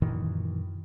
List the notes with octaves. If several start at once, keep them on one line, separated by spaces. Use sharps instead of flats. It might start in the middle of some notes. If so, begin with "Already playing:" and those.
F#2 A#2 D#3 E3